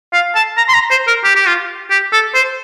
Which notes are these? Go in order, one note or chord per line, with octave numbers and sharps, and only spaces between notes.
F5
A5
A#5
C6
A#5
C5
A#4
G4
G4
F4
G4
A4
C5